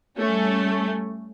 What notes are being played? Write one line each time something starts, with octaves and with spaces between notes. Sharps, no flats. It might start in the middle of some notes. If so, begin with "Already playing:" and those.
G3 A3 C#4